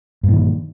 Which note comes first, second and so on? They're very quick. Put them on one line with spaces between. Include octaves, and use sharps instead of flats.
G2 A#2 D#3